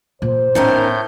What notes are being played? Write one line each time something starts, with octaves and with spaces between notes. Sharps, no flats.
A#2 C5
A2 D#3 B3 C#4 A#4 G6